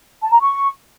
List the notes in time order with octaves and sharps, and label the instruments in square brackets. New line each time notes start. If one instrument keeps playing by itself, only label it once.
[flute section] A5
A#5
C#6